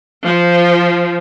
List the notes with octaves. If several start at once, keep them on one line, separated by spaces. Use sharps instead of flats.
F3